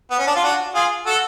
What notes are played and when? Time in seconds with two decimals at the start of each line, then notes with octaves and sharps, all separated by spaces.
0.11 B3
0.19 C#4
0.27 D4
0.36 F4
0.43 D4 F#4
0.75 F4 G#4
1.06 F#4 A4